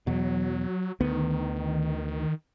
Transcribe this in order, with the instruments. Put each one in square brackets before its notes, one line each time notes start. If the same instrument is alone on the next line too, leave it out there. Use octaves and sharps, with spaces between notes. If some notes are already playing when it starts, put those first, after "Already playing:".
[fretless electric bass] E2 B2 [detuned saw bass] F#3
[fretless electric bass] D2 B3 [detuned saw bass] D#3